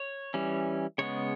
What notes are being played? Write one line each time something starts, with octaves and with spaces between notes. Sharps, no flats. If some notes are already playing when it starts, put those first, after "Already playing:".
Already playing: C#5
E3 G3 C#4
C#3 G#3 B3 C#5